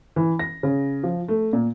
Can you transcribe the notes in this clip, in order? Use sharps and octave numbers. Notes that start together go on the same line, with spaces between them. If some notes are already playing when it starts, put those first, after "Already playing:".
E3
A#6
C#3
F3
A3
A#2